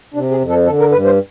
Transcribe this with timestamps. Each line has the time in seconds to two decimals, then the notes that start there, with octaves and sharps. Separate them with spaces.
0.14 C3 D4
0.31 G#4
0.40 F2
0.49 A4
0.66 D3 A4
0.80 A#4
0.91 G2 B4
1.05 C5